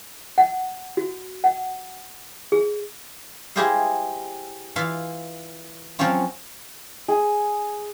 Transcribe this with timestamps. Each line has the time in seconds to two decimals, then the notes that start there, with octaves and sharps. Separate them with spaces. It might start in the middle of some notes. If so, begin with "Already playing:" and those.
0.38 F#5
0.97 F#4
1.44 F#5
2.52 G#4
3.56 E4 G4 G#4 C5 D#5 F5
4.76 E3 F4 E5 F5
5.99 F3 F#3 C4 C#4 F4
7.08 G#4